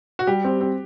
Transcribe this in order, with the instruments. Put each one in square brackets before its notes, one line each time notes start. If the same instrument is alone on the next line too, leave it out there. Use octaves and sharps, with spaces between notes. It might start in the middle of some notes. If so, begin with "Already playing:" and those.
[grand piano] F#4
[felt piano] G3 [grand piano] G4
[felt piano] C4
C4